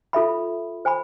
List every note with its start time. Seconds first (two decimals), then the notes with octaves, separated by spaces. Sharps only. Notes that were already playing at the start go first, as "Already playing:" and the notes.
0.13 F4 A4 E5 B5
0.85 C5 G#5 B5